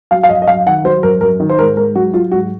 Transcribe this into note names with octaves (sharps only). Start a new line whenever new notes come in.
F#3 F5
F5
F#2 D#5
D#5
F#2 F5
D#3 F#5
F#3 C5
F#2 A#4
F#2 A#4
D#3
C5
G#2 A#4
G#2 A#4
F#3 F#4
F#3 F4
G#2 F#4